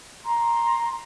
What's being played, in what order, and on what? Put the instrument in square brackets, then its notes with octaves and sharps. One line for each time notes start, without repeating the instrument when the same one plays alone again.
[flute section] A#5 C6